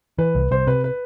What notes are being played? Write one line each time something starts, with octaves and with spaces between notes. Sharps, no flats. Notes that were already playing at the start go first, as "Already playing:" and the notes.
E3 B4
C2
C2 C5
C3 B4
B4